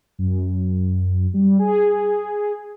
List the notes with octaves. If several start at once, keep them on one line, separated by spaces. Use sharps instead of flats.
F#2
G3
G#4